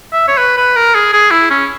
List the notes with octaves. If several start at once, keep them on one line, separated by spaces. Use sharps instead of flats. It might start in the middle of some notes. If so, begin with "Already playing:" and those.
E5
C#5
B4
B4
A#4
G#4
G#4
E4
C#4